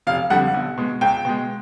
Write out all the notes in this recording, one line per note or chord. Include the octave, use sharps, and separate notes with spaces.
F1 F5
F2 D3 G3 F#5
B1
B2 G#3
C#2 G5
B2 G#3